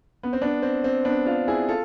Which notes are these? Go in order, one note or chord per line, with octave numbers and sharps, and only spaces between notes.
B3
C4
B3 D4
C4
C4
B3 D4
D4 F4
E4 G#4
F4 A4